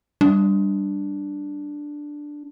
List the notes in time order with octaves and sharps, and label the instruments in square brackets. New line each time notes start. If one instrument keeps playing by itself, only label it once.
[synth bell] G3 [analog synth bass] D4